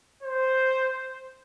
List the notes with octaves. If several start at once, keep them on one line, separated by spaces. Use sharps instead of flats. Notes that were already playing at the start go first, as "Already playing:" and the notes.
C5